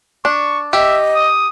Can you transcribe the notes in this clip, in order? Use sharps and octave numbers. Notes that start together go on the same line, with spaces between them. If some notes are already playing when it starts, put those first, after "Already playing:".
D4 C#6
G4 D#5 E5
D#6